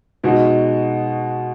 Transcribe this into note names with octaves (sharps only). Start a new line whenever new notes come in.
B2 G#3 D#4 F#4